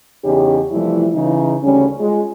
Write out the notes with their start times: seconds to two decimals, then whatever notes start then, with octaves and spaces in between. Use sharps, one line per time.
0.24 E2 C#3 C#4 D#4 G4
0.72 C3 E3 F3 G3 A3 E4
1.13 C#3 E3 D#4
1.63 D2 C#3 G3 C#4
2.00 G#3 F4 G#4